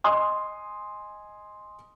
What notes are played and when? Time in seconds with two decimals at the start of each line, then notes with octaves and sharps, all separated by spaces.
0.04 D#5 G#5 C6 D#6